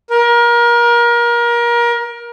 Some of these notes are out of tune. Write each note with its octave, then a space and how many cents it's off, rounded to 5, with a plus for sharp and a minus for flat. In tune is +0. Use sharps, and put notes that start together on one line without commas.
A#4 +30